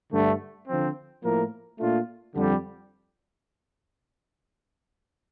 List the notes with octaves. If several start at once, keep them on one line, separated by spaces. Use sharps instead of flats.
G2 D3 A3
D3 F3 C4
A2 F3 A#3 E4 A#4
A#2 A3 D4 F4
F2 D3 G3